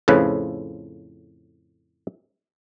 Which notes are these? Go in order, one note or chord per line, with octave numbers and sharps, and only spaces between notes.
F2 A2 C#3 F3 B4